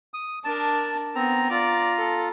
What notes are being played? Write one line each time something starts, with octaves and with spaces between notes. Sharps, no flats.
D#6
D4 A#4 A5
B3 C4 A#5
F4 D5 A#5
A4